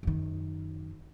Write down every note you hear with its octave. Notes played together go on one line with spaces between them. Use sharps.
F#2 D#3